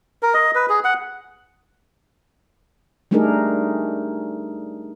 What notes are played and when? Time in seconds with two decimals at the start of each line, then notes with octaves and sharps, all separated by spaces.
0.23 A#4
0.34 D#5
0.55 B4
0.69 G#4
0.84 F#5
3.11 G3 A3 D4 D#4 G#4 A#4